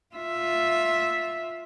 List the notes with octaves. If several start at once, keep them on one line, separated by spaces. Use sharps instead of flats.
F4 E5